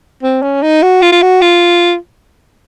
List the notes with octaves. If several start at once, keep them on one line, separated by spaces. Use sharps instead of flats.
C4
C#4
D#4
F#4
F4
F4
F#4
F4